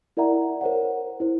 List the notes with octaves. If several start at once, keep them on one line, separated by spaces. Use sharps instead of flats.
E4 A#4 D5 E5 F#5 A#5
A#4 C5 C#5 F#5
E4 C5